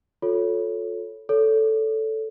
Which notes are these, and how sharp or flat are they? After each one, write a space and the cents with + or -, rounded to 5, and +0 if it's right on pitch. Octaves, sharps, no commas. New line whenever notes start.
F4 +40 A4 +0 C#5 +0
A4 +0 C#5 +35